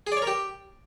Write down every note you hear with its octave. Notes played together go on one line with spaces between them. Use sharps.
G#4
D5
C#5
A#4
G4